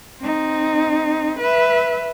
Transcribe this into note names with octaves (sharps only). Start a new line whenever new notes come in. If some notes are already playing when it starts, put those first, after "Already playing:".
C4 D#4
B4 E5